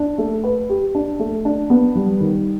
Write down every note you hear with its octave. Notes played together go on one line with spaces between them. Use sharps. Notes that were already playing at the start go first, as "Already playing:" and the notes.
Already playing: D4
A3
B4
G4
D4
A3
D4
B3
G3
D#3